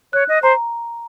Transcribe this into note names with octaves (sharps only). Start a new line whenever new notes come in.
C#5 F#6
D#5
C5 A#5